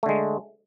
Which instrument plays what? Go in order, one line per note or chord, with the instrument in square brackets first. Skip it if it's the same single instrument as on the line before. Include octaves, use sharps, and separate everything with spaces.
[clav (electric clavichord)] A3
D3
G#3